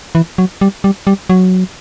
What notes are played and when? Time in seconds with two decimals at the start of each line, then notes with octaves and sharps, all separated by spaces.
0.15 E3
0.38 F#3
0.61 G3
0.84 G3
1.07 G3
1.30 F#3